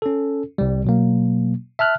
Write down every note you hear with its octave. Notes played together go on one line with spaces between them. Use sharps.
C#4 A4
C2 G3
B2 F#3 A#3
E5 A5 F6 F#6